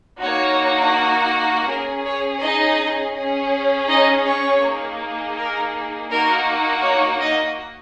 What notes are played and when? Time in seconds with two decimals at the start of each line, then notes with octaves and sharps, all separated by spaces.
0.20 A#3 D#4 F#4 C#5
1.68 C#4 G#4 A#4
2.05 C#5
2.41 D#4 D#5
3.15 C#4 G#4
3.89 D#4 D#5
4.25 C#5
4.63 A#3 D#4 G#4
5.36 A#4
6.09 A#3 D#4 F#4 A#4
6.83 C#5
7.20 D#4 D#5